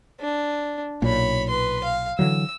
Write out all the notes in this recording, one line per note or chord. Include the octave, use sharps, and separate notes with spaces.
D4
B1 A#2 C#5 B5
B4 C6
F5
D3 E3 F#3 E6